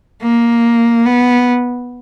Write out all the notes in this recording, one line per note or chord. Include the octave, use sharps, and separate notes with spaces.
A#3
B3